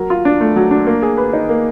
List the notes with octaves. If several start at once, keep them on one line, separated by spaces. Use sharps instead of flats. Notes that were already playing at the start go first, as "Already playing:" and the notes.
Already playing: F#3 A#4
F4
D4
A3
F#3
D4
A#3
G#4
B4
D#4
A#3